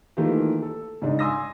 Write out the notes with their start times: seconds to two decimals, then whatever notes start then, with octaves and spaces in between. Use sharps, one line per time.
0.17 D#3 E3 A3 A#3 F4 G4
0.62 A4
1.02 G#2 C#3 D4 D#4
1.19 G#5 C6 D#6 E6 A#6